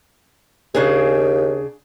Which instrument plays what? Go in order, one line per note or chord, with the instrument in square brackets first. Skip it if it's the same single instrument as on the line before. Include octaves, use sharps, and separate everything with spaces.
[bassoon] D#2 [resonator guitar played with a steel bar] C#3 D4 G#4